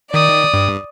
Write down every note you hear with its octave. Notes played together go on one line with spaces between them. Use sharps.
D#3 D5 D#6
G2